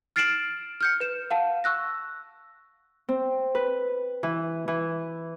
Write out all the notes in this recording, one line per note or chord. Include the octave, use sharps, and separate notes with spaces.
F6 A6 C7 D7 E7 F#7
F6 G6 C#7
B4 E7
F5 F#5 A5
C#6 E6 F#6 A#6
C4
B4
E3
E3